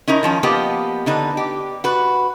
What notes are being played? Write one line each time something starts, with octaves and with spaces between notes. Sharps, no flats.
C#4 D#4 E4 A#4
D#3 F3 C#4
F3 A#3 B3 G4 D#5
D3 D#4 B4
G4
F#4 B4